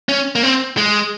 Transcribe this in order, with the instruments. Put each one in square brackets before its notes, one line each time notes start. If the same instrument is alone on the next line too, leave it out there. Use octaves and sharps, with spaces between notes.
[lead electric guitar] C#4
A#3
C4
G#3